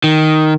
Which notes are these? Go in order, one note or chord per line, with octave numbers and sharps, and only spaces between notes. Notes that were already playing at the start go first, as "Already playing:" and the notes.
D#3